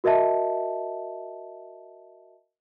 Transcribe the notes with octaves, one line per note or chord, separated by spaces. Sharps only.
F#4 A#4 D#5 E5 A5